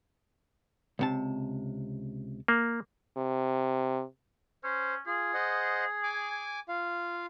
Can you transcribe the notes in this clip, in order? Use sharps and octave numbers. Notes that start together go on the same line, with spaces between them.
C#2 C3 A5
A#3
C3
C#4 C5
F4 G#4
C5 D#5 F#5
G#5 D6
F4 F5